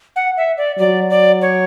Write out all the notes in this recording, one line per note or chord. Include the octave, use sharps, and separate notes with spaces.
F#5
E5
D5
F#3 D5
D5
C#5